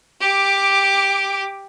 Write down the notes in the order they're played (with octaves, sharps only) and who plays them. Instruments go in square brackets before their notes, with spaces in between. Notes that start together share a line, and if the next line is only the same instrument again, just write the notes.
[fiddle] G4 D6